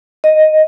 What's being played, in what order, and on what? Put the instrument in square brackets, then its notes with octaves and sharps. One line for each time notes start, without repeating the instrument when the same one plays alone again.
[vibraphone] D#5